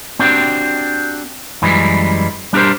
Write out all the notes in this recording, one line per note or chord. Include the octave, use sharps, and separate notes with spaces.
C4 D4 F#4 G4
F#2 E3 G3 G#3
G3 D4 G4 A#4 C5